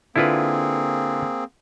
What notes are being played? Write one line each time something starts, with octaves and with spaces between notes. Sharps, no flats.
D3 A#3 C4 E4 F4 G#4 B4